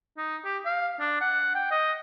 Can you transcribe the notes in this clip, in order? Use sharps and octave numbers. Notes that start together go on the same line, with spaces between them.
D#4
G4
F5
D4
F#5
G5
D#5